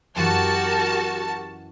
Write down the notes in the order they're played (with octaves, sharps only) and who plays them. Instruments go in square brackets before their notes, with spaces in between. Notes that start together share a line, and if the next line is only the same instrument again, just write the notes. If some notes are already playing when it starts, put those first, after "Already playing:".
[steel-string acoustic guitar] F#2 E3 [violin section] F#4 A5 [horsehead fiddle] G4 A#4